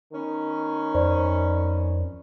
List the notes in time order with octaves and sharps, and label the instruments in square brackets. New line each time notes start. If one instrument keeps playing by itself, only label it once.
[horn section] D#3 B3 C#4
[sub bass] F2 [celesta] C5 D5